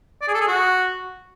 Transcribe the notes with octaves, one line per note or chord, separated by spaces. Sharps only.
D5
G#4
A4
G#4
F#4